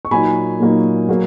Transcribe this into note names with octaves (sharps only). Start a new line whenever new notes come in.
C#6
A#2 F#3 A#3 D#4 G#5 B5
A#2 F#3 A#3 D#4
F#3 A#3